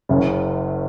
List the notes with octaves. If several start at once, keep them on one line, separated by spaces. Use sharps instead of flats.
F#1 F#2 C#3